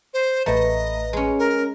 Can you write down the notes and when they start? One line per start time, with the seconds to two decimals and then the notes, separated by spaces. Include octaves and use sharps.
0.14 C5
0.46 A1 A3 B4 D#5 A#5
1.13 G#3 C#4
1.39 A#4